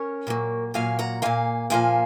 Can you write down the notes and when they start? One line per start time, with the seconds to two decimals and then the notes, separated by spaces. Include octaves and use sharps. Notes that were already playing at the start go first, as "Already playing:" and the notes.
Already playing: C#4 A#4 C#5
0.27 A#2 F#3 A#3
0.74 A#2 F#3 A#3 F5 G#5
0.99 F#5 A#5
1.22 A#2 F3 A#3 F5 G#5
1.70 A#2 F3 A#3 F5 G#5